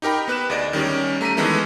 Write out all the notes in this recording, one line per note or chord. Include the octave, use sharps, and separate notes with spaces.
D#4 G4 A#4 G5 B5
B3 B4 F#6 E7
D2 G#4 D5 D#5 D7
D#3 G3 C#4 G4
A3 A#5 B6 D#7
D#3 E3 G#3 B3 E4 A4